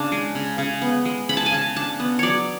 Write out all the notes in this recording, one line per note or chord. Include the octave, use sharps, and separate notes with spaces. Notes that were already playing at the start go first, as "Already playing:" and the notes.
Already playing: C#3 D4 A5
G#3
C#3
C#3
B3
G#3
C#3 B5
A5
G#5
C#3 A5
D4 A5
B3
F#3 C#5 D5